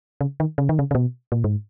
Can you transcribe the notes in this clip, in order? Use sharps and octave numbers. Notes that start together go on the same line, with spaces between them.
C#3
D#3
C#3
D#3
C#3
C#3
B2
A#2
G#2